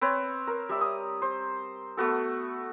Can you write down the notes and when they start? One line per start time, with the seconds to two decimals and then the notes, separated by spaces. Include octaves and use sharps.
0.01 C4 B4 C#5
0.47 A#4
0.69 G3 E5
0.81 D#6
1.22 C5
1.97 A3 B3 F#4 A4